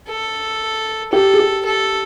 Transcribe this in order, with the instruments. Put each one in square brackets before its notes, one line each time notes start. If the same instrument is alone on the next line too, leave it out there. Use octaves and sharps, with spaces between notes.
[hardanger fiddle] A4
[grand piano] G4 [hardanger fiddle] A4
[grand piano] G#4
G4
[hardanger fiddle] A4